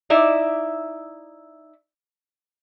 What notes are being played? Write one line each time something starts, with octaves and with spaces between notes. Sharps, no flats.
D#4 E4 D5 E5